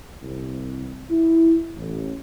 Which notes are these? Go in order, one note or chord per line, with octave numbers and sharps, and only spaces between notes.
C2
E4
A1